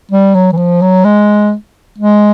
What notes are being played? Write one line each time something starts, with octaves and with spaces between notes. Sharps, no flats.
G3
F#3
E3
F3
F#3
G#3
G#3